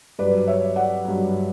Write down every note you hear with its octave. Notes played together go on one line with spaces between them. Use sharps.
G2 F#3 B4 D5
C#5 E5
D5 F#5
G2 F#3